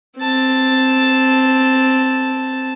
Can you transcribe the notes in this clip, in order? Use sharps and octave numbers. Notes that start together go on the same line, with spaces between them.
C4 A5